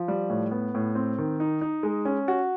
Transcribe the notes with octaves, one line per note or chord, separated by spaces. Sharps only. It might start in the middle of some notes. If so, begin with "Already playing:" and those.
Already playing: F3
G3
A2
B3
A2
C4
D#3
D#4
D#4
G#3
C#4
F#4